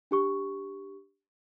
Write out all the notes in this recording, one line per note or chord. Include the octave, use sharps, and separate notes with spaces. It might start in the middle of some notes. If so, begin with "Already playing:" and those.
D4 G4 C#6